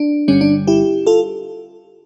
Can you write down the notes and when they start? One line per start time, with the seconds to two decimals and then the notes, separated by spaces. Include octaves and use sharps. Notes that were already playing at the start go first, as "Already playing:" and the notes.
Already playing: D4
0.28 G1 G2 D3 G3 C#4
0.41 D4
0.67 E4 G4
1.06 F4 A4